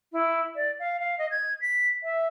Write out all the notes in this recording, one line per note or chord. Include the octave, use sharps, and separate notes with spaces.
E4
D5
F5
F5
D#5
G#6
B6
E5